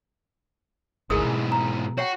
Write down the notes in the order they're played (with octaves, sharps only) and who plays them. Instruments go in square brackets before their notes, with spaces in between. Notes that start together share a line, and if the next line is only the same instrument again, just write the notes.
[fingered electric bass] G#1 D2 [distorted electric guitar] G#2 E3 [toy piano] G#4 A#4 D#6
[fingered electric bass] B2 B3
[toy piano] A#5
[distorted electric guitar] F#4 [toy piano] C#5 F#5 G5